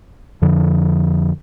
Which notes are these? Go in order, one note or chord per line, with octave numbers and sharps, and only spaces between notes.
F2 D3 F3